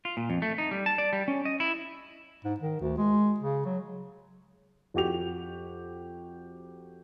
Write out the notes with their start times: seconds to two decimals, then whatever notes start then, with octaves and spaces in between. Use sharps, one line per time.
0.05 F4
0.17 A#2
0.30 F2
0.42 A3
0.58 D#4
0.71 G3
0.86 A5
0.98 D5
1.13 G3
1.28 C#4
1.45 D#5
1.60 E4
2.44 G#2
2.60 D#3
2.81 D2
2.97 G#3
3.40 C#3
3.65 F#3
4.94 F2 F#4 G4 F7